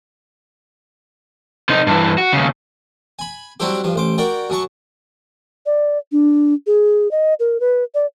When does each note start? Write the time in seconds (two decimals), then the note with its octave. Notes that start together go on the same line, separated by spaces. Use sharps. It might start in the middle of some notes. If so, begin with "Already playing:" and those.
1.69 C3 D#4
1.87 G2 E3
2.18 F#4
2.33 D#2 C#3
3.19 G#5 B5
3.60 F#3 G3 C4 D4 E4 G4
3.84 G2 F3
3.96 A1 C5 D6
4.18 F#4 A#4 D5 G5
4.50 F#2 F#3 A5 C#6
5.66 D5
6.12 D4
6.67 G#4
7.11 D#5
7.40 A#4
7.60 B4
7.95 D5